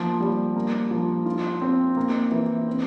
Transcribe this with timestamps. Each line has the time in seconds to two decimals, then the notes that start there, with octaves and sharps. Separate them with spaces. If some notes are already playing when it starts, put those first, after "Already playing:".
Already playing: F3 A#3
0.20 G3
0.56 A#3
0.91 F3
1.26 F4
1.61 C4
1.97 A#3
2.31 E3
2.67 C4